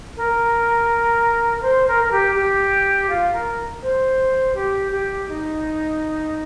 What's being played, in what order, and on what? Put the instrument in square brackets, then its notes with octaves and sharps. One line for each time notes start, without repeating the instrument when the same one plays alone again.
[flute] A#4
A#4
C5
A#4
A#4
G4
G4
F4
A#4
C5
G4
G4
D#4